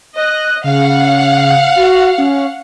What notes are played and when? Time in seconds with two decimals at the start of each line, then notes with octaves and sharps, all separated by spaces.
0.16 D#5 F#6
0.64 C#3 F5 F#5
1.76 F#4
2.18 C#4